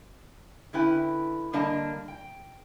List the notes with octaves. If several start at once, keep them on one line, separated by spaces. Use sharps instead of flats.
D3 C#4 E4 B4 G5
D3 G3 A#3 D4 D#5 A5
G5